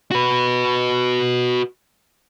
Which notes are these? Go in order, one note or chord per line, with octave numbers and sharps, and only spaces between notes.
F#4 B4